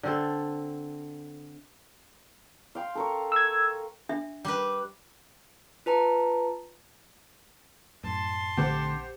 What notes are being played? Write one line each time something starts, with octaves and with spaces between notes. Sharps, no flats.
D3 C4 A4
F5 G5 C6
A4 A#4 C#6
E6 G#6
D4 E5
G3 B4
F4 B4 A5 A#5
F#2 A2 A5 C6
A#1 D3 A3 C4 G4 C5 F#5 C#7